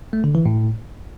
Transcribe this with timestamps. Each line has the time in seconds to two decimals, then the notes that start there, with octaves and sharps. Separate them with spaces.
0.13 A3
0.24 D3
0.35 E3
0.46 A2